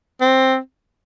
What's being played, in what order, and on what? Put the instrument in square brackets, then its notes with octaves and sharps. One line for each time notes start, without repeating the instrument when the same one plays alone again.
[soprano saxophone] C4